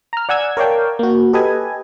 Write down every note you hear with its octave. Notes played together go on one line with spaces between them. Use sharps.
A#5 F6
D5 F#5 G#5 E6 G#6
A#4 C#5 D5 F5 G5 A5
A#3 F#4
G4 A4 B4 D#5 G#5